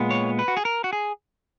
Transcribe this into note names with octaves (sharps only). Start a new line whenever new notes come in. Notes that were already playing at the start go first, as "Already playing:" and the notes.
Already playing: A#2 G#3 B3
C#5
B4
F#4
G#4
A#4
F#4
G#4